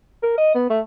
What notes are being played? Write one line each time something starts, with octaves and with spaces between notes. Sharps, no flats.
A#4
D#5
B3
A3